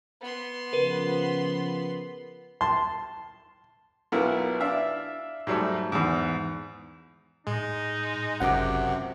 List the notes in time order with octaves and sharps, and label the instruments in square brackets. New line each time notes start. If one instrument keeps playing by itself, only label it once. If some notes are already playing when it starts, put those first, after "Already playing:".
[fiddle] B3 C6
[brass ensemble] C#3 F3 [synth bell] A#4 B4
[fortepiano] A5 C6
B1 B3 E4 F4 A#4
D4 E5 F5
G#2 F#3 G3 A3
E2 G#2
[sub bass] A2 [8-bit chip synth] G#3 [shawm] D#4
[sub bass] G1 [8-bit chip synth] C#2 F#2 C3 [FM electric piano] F#5 D6